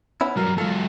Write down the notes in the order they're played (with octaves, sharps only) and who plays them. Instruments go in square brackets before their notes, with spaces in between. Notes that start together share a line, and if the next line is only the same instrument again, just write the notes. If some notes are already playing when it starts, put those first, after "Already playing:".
[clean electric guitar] B3 C#4 E4
[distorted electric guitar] G2 F#3 [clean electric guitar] A#4
[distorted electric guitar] F#3 G#3 [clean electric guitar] F4 A4